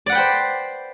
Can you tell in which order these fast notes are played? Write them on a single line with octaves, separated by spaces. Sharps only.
D5 F#5 B4 G5 C5